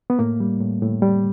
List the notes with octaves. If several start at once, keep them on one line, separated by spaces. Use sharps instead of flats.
B3
A2 A#3
G3
A2
A2
G3